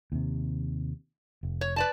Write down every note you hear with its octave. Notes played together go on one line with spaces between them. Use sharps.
D#2 C3
F1
C#5
B4 D5 A5